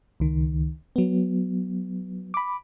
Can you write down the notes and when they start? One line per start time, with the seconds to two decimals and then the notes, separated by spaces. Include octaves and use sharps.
0.20 C#2 D#3
0.96 F#3 B3
2.34 B5 D6